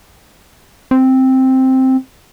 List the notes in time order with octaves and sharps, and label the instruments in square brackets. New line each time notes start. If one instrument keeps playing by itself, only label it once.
[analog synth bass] C4